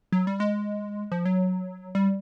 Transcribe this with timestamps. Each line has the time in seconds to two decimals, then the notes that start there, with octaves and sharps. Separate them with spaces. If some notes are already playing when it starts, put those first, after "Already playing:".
0.12 F#3
0.27 G3
0.40 G#3
1.12 F3
1.25 F#3
1.95 G3